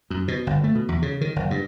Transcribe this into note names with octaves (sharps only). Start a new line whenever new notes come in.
F#2
B2
G1
A3
B2
E2
C#3
D#3
F#1
G2